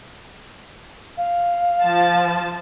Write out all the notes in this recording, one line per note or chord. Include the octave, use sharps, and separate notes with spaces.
F5
F3 A5